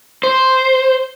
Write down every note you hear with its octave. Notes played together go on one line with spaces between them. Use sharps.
C5